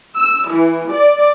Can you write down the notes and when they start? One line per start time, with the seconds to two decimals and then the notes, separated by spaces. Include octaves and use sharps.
0.17 E6
0.49 E3
0.91 D5